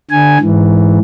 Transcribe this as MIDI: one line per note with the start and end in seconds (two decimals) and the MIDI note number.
0.11 0.38 50
0.11 0.38 80
0.41 0.98 44
0.41 0.98 52